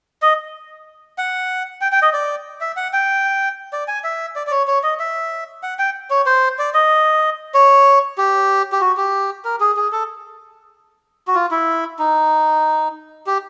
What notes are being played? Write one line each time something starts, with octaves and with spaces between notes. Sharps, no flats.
D#5
F#5
G5
G5
D#5
D5
E5
F#5
G5
D5
G#5
E5
D5
D5
C#5
C#5
D#5
E5
F#5
G5
C#5
C5
D5
D#5
C#5
G4
G4
F#4
G4
A#4
G#4
G#4
A4
F#4
F4
E4
D#4
G4